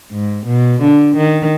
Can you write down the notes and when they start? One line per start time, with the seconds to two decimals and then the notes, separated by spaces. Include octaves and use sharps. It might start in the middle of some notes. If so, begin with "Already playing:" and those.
0.12 G#2
0.47 B2
0.81 D3
1.16 D#3